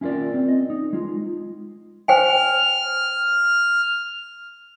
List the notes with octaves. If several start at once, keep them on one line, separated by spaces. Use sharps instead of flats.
C#4 E4 F4 A#4 D5
C4
D#5
D#4
G#3 F4
C5 G5 G#5 F6